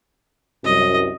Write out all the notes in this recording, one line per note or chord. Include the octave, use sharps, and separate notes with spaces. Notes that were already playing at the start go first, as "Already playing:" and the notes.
C2 F#2 D#5